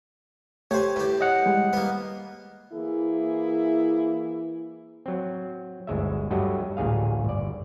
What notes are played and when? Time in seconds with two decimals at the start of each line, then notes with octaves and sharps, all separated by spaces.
0.71 A3 G4 C5 C#5 F#5 G#5
0.96 A2 G4 B4
1.21 D#5 F#5
1.46 G3 G#3
1.73 A#3 B3
2.73 E3 A#3 E4 G#4
5.06 F#3 C4
5.87 G1 D2 G#3 E5
6.31 G2 F#3 A3 F#4 G4 D#5
6.77 A1 D2 A#2 G#4 F5
7.25 G1 D5